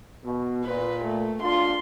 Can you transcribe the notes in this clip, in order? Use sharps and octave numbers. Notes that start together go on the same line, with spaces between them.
B2
A#2 B4
A3
D4 F4 C6